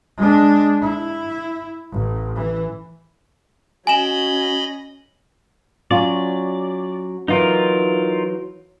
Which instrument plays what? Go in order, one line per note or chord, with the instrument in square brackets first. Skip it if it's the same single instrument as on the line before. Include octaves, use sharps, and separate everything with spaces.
[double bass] G#3 D4
E4
A1
E3
[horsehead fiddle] C#4 [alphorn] F#4 [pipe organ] D#5 B5 [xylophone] G#5 E7
[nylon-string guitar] F#3 C#4 F4 [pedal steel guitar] D5
[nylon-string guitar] E3 F#3 [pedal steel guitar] D#4 F4 A#4